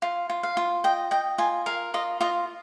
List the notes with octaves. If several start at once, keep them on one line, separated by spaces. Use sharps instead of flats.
F4
F4
F5
F4
D#5 G5
D#5 G5
F4 G#5
A#4 F5
F4 D#5
F4 D#5